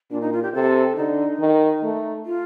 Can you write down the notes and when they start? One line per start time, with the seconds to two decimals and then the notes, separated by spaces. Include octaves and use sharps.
0.11 A#2 D4
0.21 D#4
0.33 F4
0.43 G4
0.54 C3 A4
0.96 D3 D#4
1.40 D#3
1.83 A3
2.25 F4